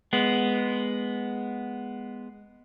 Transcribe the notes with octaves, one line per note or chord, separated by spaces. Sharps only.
G#3 B3